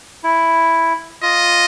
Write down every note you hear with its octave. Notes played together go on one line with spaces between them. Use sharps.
E4
F4 D#5